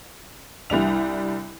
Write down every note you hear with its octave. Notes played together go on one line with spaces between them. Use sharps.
C2 G3 D4 F7